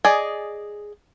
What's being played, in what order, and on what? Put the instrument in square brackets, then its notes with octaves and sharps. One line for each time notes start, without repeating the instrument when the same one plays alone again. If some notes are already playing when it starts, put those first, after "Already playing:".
[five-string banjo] G#4 D5 D#5